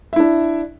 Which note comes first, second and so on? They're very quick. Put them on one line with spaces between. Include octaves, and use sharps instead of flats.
E5 E4 D4